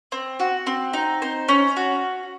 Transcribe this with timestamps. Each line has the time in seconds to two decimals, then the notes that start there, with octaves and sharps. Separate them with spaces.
0.12 C4
0.40 F#4
0.67 C4
0.93 D#4
1.22 C5
1.49 C#4
1.77 F#4